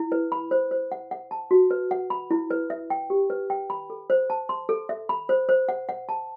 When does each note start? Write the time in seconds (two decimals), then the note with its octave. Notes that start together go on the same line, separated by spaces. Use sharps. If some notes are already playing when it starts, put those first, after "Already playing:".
Already playing: E4
0.12 B4
0.32 B5
0.51 C5
0.71 C5
0.92 F#5
1.11 F#5
1.31 A5
1.51 F#4
1.71 B4
1.91 F#5
2.10 B5
2.31 E4
2.51 B4
2.70 E5
2.90 G5
3.10 G4
3.30 B4
3.50 G5
3.70 B5
3.90 A4
4.10 C5
4.30 A5
4.49 C6
4.69 A4
4.89 E5
5.09 B5
5.29 C5
5.49 C5
5.69 F#5
5.89 F#5
6.09 A5